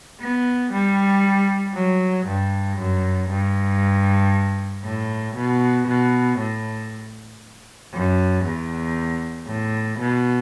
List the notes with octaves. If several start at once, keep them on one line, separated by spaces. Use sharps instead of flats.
B3
G3
F#3
G2
F#2
G2
A2
B2
B2
A2
F#2
E2
A2
B2